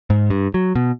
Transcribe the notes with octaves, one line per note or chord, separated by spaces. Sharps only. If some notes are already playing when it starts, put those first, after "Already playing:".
G#2
G2
F#3
B2